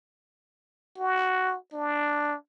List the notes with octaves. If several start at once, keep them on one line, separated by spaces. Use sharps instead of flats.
F#4
D4